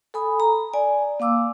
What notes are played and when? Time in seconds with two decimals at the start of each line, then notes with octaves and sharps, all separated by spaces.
0.14 A4 G#5 B5 D#6
0.40 A#5
0.74 D5 G#5
1.20 A#3 F5 D6 E6